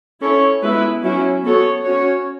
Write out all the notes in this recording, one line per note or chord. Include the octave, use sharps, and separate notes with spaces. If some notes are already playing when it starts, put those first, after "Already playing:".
C#4 E4 A4 C#5
G#3 B3 E4 B4
F#3 C#4 E4
B3 F#4 A4 C#5
C#4 F#4 C#5